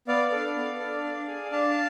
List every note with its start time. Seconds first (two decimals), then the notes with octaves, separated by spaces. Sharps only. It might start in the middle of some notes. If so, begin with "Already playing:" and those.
0.08 B3 D5 F5
0.32 D4 A4
0.56 B3
0.80 D4 A4
1.04 D4
1.28 G#4
1.52 D4 F5 A5